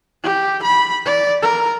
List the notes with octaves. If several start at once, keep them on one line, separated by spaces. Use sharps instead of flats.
G4
B5
D5
A#4